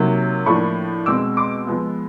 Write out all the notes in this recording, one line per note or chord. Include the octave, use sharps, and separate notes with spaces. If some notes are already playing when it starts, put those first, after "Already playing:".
Already playing: C3 D#3 F#3 A#3
A2 F3 A#3 D4 B5 C#6
B2 G#3 C4 D6 E6
C6 D6
F3 G#3 B3